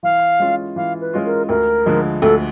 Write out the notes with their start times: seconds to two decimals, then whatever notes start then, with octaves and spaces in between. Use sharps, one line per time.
0.03 E3 F5
0.39 G#3 C#4 F4
0.76 E3 F5
1.01 B4
1.13 G#3 C#4 F4
1.26 A#4
1.49 D2 A#4
1.86 D3 F3 G#3
2.22 D2 A4